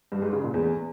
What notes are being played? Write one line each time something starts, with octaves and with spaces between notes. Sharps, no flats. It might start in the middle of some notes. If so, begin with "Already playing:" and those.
G2
G#2
C#3
A#2
E2